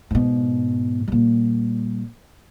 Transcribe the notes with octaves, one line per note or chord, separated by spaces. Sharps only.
G#2 B2
A#2 G3